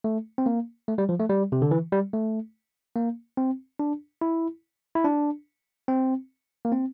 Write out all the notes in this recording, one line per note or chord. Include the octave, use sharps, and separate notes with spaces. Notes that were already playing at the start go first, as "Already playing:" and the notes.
A3
C4
A#3
A3
G3
F3
A3
G3
C3
D3
E3
G3
A3
A#3
C4
D4
E4
E4
D4
C4
A#3
C4